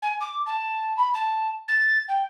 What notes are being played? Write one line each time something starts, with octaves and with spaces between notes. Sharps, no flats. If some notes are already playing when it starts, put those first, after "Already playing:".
G#5
D6
A5
B5
A5
A6
G5